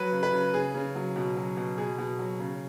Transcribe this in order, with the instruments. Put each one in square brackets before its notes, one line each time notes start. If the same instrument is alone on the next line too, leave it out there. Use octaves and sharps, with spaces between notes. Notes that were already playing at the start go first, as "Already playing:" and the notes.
Already playing: [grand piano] F#3 B4
C#3
B4
C#3
C#3 G#4
C#3
F#3
B2
F#3
B2
B2 G#4
B2
F#3
C#3